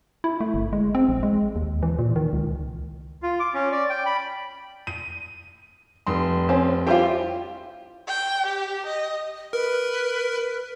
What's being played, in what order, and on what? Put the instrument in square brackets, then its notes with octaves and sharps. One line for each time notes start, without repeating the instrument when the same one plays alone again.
[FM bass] E4
A3
G1
G#3
C4
A#1
G#3
D#2
E3
A#2
D#3
C#2
[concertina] F4
D6
C#4
D5
G5
B5
[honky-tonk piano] D#7
F1 C6
[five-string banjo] C4 C#4
[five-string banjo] G3 E4 F4 [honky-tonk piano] G4 C5 G5
[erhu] G5
G4
D#5
[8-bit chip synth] A#4 [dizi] B4